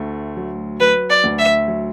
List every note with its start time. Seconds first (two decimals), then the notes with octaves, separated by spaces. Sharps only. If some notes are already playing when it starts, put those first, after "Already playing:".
Already playing: D2 A3
0.37 F#3
0.80 F#3 B4
1.10 D5
1.24 D2
1.39 E5
1.68 F#3